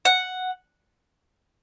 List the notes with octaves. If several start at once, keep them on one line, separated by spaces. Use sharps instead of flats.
F#5